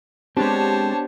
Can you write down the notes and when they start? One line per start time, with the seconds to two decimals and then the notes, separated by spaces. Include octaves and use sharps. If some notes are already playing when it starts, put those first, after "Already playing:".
0.37 G#3 B3 C4 D4 G4 C5 C#5 A5